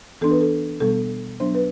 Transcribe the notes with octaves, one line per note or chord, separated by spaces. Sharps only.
E3 B3 D4 A4
B4
A4
B2 G3 B3 A4
F#3 B3 D4 C5
B4